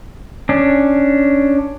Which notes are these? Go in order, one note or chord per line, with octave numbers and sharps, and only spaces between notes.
C#4 D4